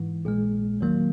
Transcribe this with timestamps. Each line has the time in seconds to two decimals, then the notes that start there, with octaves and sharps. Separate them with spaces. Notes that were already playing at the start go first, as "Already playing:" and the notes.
Already playing: G#2 E3
0.25 A#1 A#2 G#3
0.81 E2 D#3 F#3 A#3